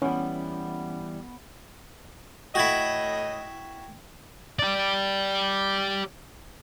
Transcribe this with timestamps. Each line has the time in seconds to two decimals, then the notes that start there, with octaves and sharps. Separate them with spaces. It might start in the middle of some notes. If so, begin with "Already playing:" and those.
0.02 E3 G3 B3 C#4
2.55 A2 E4 F#4 D#5 G5 G#6
4.59 G4 D5